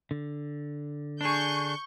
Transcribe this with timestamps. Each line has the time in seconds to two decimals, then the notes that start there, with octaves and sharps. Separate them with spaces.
0.11 D3
1.21 D4 G#4 C#6 G6